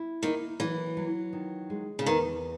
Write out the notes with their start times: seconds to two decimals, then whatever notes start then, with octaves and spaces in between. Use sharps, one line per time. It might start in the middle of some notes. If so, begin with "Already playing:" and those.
Already playing: E4
0.23 D#3 A#3
0.60 E3 F#3
0.97 F#3
1.33 D#3
1.70 G#3
1.99 C#3
2.06 E2 D#3